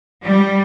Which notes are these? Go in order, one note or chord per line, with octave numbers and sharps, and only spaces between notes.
G3